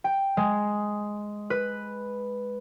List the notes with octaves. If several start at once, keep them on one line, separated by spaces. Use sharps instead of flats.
G5
G#3
B4